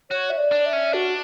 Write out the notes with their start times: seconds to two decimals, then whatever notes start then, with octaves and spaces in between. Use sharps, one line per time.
0.10 F#4 C#5
0.30 E5
0.38 D5
0.52 D4
0.66 E5
0.73 C#4
0.93 D4 F#4